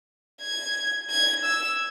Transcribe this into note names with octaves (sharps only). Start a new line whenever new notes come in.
G#6
G#6
E6